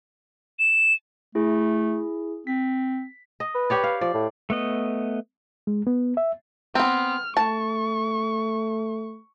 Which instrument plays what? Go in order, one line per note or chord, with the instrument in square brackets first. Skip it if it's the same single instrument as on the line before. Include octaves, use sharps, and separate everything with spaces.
[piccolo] E7
[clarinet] A3 [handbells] E4 G#4
[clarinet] C4 [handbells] B6
[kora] D#5
[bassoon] B4
[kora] G4 C#5 D5
F5
[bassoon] F3 [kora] D5
[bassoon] A2
[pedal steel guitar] A3 B3 D#5
[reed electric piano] G#3
B3
E5
[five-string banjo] B3 C4 [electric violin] F6
[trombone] A3 [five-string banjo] A5 [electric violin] C#6